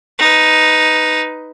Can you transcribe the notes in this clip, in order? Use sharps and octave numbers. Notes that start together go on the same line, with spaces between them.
D#4 B4